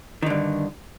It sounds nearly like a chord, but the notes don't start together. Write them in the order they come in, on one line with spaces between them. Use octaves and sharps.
D#3 D3 G2